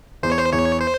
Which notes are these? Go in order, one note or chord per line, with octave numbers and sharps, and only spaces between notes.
E2 C5
C#5
C5
E2 C#5
C5